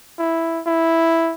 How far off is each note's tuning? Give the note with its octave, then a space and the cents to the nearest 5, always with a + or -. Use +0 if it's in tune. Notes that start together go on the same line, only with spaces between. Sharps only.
E4 +0
E4 +0